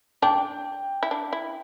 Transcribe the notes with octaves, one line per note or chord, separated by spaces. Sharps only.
D4 G5
E4
D4
E4